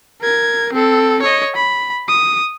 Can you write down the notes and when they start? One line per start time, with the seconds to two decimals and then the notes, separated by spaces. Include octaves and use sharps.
0.21 A#4 G#6
0.73 C4 A4
1.22 C#5 D#5
1.56 B5
2.08 D#6